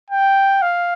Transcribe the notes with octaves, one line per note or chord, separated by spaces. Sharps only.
G5
F5